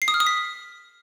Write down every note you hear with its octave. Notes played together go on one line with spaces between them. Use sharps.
C7
D#6
F6
D#6
B6